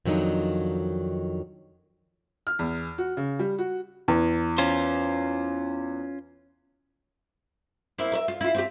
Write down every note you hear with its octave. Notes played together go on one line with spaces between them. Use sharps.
F2 D#3 F#3 D4 D#4
F6
E2
F#4
C#3
G3
F#4
E2
C#4 F4 C5
A#3 C4 E4
A#4 C5 E5
F4
E4 F4
C4 F#4 G4